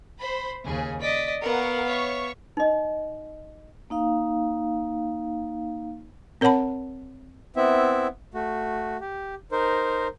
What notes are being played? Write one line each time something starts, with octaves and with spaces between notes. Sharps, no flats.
C5 B5
D#2 C#3 G#4
D5 D#5 B6
B3 A#4 F5 F#5 C#6
C#5 E5 C#6
D#4 D#5
A#3 D#4 F5
C4 A#4 C#5 F#5 A5 B5
B3 C4 E4 E5
A3 F#4
G4
D#4 A#4 C5